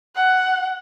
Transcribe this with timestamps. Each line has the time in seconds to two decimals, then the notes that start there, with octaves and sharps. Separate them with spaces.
0.15 F#5